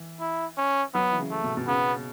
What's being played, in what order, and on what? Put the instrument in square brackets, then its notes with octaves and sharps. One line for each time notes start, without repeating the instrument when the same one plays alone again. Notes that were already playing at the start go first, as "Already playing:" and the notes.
Already playing: [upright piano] E3
[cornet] E4
C#4
[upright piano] F#3 [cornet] B3
[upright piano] E3
C#3
[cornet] A3
[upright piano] B2
B2
[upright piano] C#3 [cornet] B3